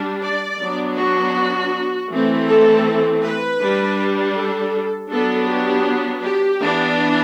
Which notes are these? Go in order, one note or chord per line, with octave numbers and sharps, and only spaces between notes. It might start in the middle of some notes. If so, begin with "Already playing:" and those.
Already playing: G3 D4
D5
F#3 B3 D4
F#4
E3 A3 C4
A4
B4
G3 D4
A4
F#3 B3 D4 A4
G4
G4
E3 B3 D4